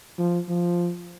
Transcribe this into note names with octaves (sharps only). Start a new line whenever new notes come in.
F3
F3